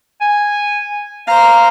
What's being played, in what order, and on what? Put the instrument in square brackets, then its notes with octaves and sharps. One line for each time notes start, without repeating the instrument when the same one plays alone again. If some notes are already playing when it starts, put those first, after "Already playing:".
[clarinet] G#5
[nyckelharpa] C5 A#5 [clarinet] F5